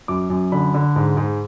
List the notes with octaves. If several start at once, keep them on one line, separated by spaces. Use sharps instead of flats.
F#2 D6
F#2
D3 B5
D3
G#2
G#2